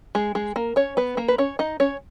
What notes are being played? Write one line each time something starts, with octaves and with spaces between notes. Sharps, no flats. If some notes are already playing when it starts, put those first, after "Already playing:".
G#3 G#4
G#3 G#4
A#3 A#4
C#4 C#5
B3 B4
A#3 A#4
B4
C#4 C#5
D#4 D#5
C#4 C#5